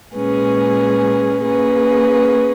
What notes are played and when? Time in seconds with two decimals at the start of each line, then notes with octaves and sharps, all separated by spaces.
0.15 A#2 G#3 C#4 G#4 B4
1.43 A#3 C#4 G#4 B4